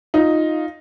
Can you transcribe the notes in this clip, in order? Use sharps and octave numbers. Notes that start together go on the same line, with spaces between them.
D#4 F4